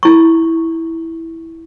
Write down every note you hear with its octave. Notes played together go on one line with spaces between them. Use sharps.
E4 C#6